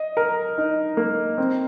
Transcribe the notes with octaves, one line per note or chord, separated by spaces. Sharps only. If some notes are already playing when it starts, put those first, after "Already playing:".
Already playing: D#5
A#4
D#4
A#3
C4